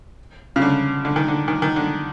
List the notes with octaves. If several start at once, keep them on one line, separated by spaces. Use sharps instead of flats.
C#3
D3
D3
D#3
D3
D#3
D#3
D3